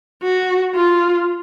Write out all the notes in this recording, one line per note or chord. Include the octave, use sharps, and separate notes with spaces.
F#4
F4